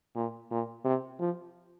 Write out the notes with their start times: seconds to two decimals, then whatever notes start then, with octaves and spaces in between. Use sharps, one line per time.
0.16 A#2
0.51 A#2
0.85 C3
1.20 F3